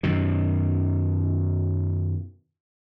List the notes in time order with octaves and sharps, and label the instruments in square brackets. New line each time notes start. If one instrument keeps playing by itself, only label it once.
[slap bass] F#2 B2 D#3